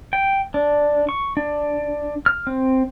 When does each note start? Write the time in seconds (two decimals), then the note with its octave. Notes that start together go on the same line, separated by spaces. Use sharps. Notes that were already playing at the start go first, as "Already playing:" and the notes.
0.13 G5
0.54 D4
1.09 C#6
1.37 D4
2.26 F6
2.47 C4